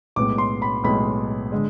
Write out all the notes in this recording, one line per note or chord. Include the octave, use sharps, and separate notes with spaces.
B1 A2 G#3 B3 D6
C6
B5
B1 A2 G#3 B3 B5
D3 G#3